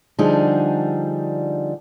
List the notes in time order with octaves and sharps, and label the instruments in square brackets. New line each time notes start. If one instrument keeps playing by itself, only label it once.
[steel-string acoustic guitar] D3 F3 G3 D4 D#4 G#4